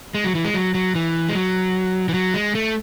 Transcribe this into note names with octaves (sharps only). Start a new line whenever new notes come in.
G#3
F#3
E3
G#3
F#3
F#3
E3
G#3
F#3
E3
F#3
G#3
A3